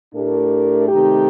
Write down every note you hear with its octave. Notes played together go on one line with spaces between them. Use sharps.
A2 A3 D4 G4 A#4
C3 D#3 A3 D#4 G4